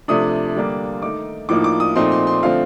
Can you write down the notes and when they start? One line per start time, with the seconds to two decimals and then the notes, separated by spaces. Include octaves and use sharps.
0.08 C3 F3 A3 D4 D#6
0.56 D3 G3 A#3 D4
1.02 D#3 A3 D#4 D6
1.49 A2 F3 A#3 D#4 D6
1.64 D6
1.80 D#6
1.96 A#2 F3 A3 C4 D#4 C6
2.12 C6
2.27 C6
2.43 D3 F3 A3 C4 F5